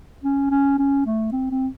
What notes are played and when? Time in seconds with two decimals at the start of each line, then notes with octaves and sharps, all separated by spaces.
0.24 C#4
0.51 C#4
0.79 C#4
1.06 A3
1.32 C4
1.51 C4